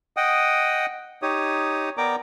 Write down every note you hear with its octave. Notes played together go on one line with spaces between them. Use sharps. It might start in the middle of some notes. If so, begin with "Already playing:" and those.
D#5 F#5 G5 D#6
D#4 G4 C#5 D#6
B3 A#4 D5 G5 A#5 D6